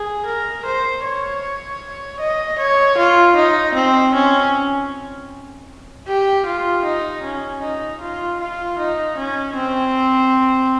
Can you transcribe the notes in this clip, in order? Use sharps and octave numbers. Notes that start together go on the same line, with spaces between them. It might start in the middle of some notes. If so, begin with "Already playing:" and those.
Already playing: G#4
A#4
C5
C#5
D#5
C#5
F4
D#4
C4
C#4
G4
F4
D#4
C#4
D#4
F4
F4
D#4
C#4
C4